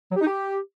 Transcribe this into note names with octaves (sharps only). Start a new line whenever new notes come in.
F#3
G4
D#4
G4